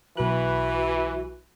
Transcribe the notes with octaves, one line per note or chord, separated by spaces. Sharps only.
B1 E3 F#4 B4 F#6